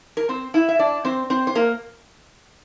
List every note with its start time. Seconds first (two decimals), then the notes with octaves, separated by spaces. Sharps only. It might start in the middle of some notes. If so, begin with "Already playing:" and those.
0.17 A#4
0.29 C4 C5
0.54 E4 E5
0.69 E5
0.79 D4 D5
1.05 C4 C5
1.30 C4 C5
1.47 C5
1.55 A#3 A#4